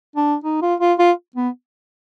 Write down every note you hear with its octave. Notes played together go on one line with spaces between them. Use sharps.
D4
D#4
F4
F4
F4
B3